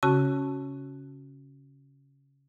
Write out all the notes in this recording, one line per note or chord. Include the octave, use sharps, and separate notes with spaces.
C#3 C#4 F#4 A5